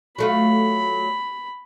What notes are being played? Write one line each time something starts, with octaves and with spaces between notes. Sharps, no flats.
F#3 A3 F4 B5